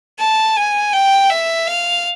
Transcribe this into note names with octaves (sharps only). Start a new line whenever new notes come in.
A5
G#5
G5
E5
F5